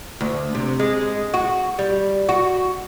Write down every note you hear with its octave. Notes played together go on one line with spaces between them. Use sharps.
D2
C3
G#3
F#4
G3
F#4